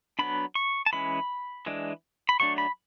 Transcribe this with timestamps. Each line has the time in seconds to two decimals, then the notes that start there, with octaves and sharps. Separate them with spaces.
0.19 F#3 B3 D4 B5
0.55 C#6
0.86 A5
0.93 E3 G#3 C#4 B5
1.66 E3 G#3 D4
2.29 B5
2.40 F#3 A3 D4 C#6
2.58 B5